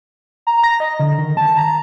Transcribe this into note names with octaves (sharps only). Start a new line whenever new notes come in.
A#5
A#6
D#5
D3
D#3
A5
A#5